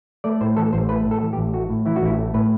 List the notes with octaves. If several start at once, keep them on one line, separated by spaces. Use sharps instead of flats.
A3 D5
A2 C5
E3 A4
A1 C5
A3 B4
A2
A4
E3
G4
A1
A3 F#4
A2
E3 E4
F#4
A1 E4
A3
A2 B4